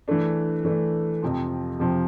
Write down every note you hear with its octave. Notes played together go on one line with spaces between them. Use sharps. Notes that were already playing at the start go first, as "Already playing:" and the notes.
E3 A3 D4
E3 A3 D4
F2 C3 F3
F2 C3 F3